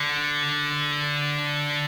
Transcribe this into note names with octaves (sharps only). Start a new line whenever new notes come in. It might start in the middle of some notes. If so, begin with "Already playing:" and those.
Already playing: D3